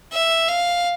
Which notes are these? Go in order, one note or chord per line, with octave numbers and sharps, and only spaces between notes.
E5
F5